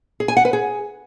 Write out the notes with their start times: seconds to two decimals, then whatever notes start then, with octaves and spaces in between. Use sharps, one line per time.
0.20 G#4
0.28 G#5
0.37 F#5
0.45 B4
0.53 G#4